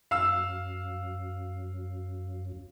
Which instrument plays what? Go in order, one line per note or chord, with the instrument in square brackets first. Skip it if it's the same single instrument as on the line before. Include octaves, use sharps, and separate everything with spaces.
[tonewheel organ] F#2 [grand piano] F5 E6